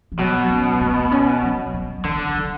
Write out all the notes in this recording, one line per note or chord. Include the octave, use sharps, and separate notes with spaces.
E3
B2 F#3
C#4
B3
B3
C#4
F#3
F#3
D3 E3
F#3